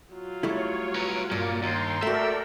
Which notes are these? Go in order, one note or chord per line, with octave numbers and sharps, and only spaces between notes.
F#3 F4
G3 A3 E4 C#5
B4 A#5
G2 A#2 A#3
D#2 G5 A#5 C6
A3 F#4 A4 A#4 D5 E5